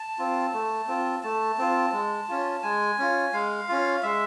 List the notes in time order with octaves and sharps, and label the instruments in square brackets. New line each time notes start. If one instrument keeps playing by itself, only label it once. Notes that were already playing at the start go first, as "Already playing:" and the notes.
Already playing: [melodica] A5
C4 F4
A3
C4 F4
A3 A5
C4 F4
G#3
C#4 F4
G#3 G#5
C#4 F4
G#3 F5
C#4 F4
G#3 E5